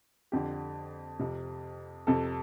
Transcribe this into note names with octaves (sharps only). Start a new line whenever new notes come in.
F2 D3 G4
F2 C3
F2 C3 A4